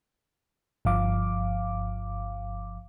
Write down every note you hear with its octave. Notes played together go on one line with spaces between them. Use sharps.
G1 G2 F3 F5 D6